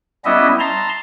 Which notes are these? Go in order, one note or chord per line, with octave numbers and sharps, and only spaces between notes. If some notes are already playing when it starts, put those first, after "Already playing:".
G3 B3 C#4 E4 D#5 E5
A5 A#5 C6